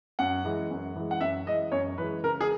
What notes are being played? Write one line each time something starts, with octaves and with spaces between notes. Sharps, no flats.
F#2 F#5
E3 G#3
F#2
E3 G#3
F#5
F#2 E5
E3 G#3 D#5
F#2 C#5
E3 G#3 B4
C#3 A#4
G#4